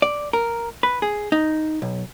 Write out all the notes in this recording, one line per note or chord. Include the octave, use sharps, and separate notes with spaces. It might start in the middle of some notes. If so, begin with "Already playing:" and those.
D5
A#4
B4
G#4
D#4
B1